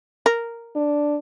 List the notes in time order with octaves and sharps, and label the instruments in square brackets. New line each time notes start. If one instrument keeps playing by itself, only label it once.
[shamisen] A#4
[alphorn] D4